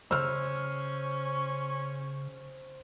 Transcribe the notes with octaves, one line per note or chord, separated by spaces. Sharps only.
C#3 C#4 C5 E6 F6